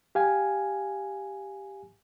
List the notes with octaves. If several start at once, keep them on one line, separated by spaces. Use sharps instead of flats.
G4 F5 G#5